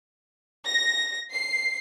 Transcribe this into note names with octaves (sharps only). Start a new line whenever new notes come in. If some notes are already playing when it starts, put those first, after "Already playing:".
A#6
C7